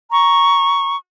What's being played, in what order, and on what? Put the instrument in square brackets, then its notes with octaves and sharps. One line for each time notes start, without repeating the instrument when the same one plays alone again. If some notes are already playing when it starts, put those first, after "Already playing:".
[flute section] A#5 C#6